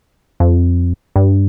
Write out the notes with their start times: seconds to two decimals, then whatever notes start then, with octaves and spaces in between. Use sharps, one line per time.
0.40 F2
1.16 G2